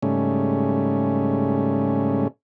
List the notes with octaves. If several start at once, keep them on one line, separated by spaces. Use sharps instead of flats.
G#2 C#3 G3 A3 C#4